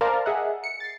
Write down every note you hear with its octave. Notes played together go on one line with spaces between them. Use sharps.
A#4 C5 D5 F5 A5 A#5
G#4 D#5 E5 F#5
C#7
A6 C7